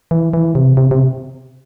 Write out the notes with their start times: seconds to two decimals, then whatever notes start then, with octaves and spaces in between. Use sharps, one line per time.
0.11 E3
0.34 E3
0.55 C3
0.77 C3
0.91 C3